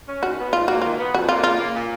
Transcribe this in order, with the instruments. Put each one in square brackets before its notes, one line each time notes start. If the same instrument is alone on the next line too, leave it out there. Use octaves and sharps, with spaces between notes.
[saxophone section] C#4
[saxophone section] D#3 [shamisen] F#4
[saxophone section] B3
[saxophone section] G#2 [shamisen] F4
[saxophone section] A#3 [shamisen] F#4
[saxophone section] D#3 [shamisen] F4
[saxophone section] B3
[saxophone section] F2 [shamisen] F#4
[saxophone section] A#3 [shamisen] F4
[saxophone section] C#3 [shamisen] F4
[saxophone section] A#3
A#2